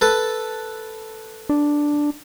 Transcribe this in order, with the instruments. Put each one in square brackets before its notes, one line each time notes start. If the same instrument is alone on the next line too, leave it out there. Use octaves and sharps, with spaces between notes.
[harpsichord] A4 B4
[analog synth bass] D4